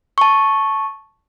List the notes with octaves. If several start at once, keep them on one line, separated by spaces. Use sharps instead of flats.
A5 C#6